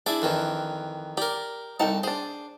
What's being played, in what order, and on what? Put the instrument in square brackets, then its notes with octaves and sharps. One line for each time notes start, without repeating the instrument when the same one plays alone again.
[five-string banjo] D4 [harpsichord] E4 G#4 D5
[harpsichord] F2 D#3 E3
[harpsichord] G4 A#4 [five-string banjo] D5
[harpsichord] C2 A5 [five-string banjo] D#4 A4 G5
[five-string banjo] D4 G#4 [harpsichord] C5